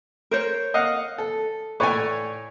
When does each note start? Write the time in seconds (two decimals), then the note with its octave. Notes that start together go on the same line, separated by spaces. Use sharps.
0.31 A#4 C5 C#5
0.74 D#5 F5 F#5
1.18 A4
1.80 A2 B4 C#5 D5 G#5 C#6